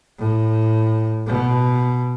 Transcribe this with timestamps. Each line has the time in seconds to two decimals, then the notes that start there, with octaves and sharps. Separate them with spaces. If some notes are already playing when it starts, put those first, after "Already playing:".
0.18 A2
1.27 B2